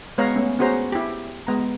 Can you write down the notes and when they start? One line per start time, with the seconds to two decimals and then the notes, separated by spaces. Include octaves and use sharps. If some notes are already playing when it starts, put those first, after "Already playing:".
0.18 G#3 B3 B4 C#5 F5 A#5
0.36 A3 B3 C#4
0.59 B3 C#4 F#4 G#4 C5 A#5
0.92 E4 G4
1.47 G#3 B3 A#5